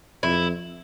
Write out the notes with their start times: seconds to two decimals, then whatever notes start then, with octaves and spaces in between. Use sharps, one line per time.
0.23 F2 E4